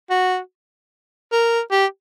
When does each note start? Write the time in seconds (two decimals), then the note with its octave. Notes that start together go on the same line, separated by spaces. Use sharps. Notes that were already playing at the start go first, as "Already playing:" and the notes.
0.10 F#4
1.32 A#4
1.72 G4